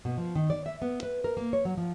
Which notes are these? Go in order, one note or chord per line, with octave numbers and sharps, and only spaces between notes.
B2
F3
D#3
D5
E5
B3
B4
A#4
A#3
C#5
F#3
F3